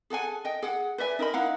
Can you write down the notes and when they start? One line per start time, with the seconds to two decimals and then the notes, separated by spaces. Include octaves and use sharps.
0.10 G#4 A4 F#5 G#5
0.45 D#5 G5
0.62 G#4 F#5
0.98 B4 D5 E5 G#5
1.19 D#4 A#4 D#5 B5
1.34 D#4 E4 F5 F#5